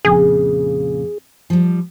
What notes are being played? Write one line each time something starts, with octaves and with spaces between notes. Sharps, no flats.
F2 A#2 C#3 G#4
F3 G3